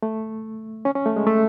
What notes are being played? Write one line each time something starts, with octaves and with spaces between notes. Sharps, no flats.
A3
C#4
C#4
A3
G#3
A3